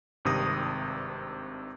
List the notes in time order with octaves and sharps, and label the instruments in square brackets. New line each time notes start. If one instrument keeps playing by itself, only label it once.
[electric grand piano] G#1 G2 C3 D#3 D#6 A#6